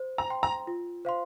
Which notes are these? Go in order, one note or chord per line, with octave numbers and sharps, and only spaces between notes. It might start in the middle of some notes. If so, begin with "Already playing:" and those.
Already playing: C5
A#5
G5 C6
A#5
F4
C5 F5 C6